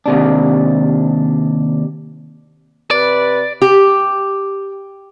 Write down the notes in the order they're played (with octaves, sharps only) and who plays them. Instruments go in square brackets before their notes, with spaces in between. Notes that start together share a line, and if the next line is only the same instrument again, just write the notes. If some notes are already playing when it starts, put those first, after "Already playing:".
[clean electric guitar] D#2 C3 D4
[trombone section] C3 B4 [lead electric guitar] D5
[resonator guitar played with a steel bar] G4